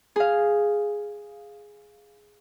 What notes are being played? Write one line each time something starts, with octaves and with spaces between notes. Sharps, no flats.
G#4 F5